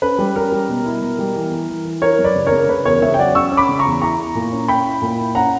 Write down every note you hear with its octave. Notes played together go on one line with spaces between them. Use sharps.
C#4 B4
G3
C#4 A#4
G3
B2
E4
B2
G3
E3
E3
E3
E3
E3 A#4 C#5
F#2
B4 D5
C#3
A#4 C#5
C#3
C#3 B4
E2 A#4 C#5
C#3 C#5 E5
G5
F#3 D5 F#5
C#4 C#6 E6
C#4
B5 D6
C#3
A#5 C#6
E2
E4 A#5 C#6
E4
A#2
C#4
C#4 G5 B5
E4
A#2
E4
C#4 F#5 A#5